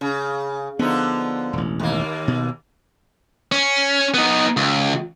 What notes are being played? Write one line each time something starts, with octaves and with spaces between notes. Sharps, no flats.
C#3
D3 F3 B3 D#4
E1 A1
D#2 A#3
B2
C#4
B3 D#4
C#2